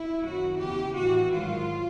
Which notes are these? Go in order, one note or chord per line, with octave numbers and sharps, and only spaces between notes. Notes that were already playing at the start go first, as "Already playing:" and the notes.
Already playing: E4
F#2 D#3 F#3 F#4
E2 C#3 E3 G4
A2 E3 F#4
G#2 D#3 F#3 F4